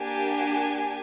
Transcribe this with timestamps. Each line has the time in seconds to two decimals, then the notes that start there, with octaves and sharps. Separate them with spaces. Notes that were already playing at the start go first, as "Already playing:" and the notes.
Already playing: A#3 D4 G4 G#5